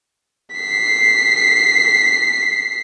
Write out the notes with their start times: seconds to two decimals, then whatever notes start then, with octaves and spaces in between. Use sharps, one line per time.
0.56 B6 C7